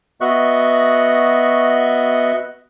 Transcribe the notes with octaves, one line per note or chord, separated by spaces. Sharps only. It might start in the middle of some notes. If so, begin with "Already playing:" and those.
B3 F#4 D#5 E5 C#6 F#6